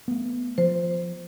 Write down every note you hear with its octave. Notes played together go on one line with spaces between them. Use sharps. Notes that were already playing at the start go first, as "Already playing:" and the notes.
A3 B3
F3 C5